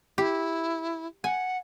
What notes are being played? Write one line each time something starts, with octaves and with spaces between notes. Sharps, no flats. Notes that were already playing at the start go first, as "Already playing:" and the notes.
E4 G4
F#5 G#5